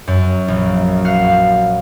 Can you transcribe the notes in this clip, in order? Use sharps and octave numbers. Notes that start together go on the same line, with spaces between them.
F#2
A#1
F#4 F5